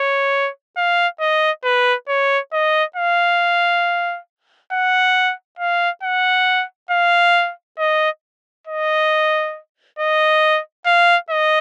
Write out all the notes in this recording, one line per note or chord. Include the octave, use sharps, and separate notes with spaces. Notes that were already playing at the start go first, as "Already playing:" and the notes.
Already playing: C#5
F5
D#5
B4
C#5
D#5
F5
F#5
F5
F#5
F5
D#5
D#5
D#5
F5
D#5